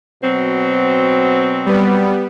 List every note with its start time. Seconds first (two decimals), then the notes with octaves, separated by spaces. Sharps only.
0.23 B2 F#3 C4
1.66 G3 B3